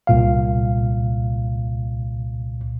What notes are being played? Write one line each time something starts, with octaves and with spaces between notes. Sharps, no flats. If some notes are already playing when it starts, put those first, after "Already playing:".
C2 A#2 F5